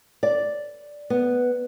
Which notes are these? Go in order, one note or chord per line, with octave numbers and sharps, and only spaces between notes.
D5
B3